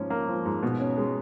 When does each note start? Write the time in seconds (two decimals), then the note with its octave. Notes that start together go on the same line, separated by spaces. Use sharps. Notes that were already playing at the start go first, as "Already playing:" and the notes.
Already playing: G#2 F3 A#3 C#4
0.10 A#3
0.28 F3
0.46 G#2
0.63 B2
0.80 C#4
0.97 G#3